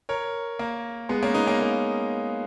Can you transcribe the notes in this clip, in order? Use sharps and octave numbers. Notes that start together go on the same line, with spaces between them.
A#4 C#5
A#3
G#3 B3
A#3 C#4
B3 D#4
A#3 C#4
A#3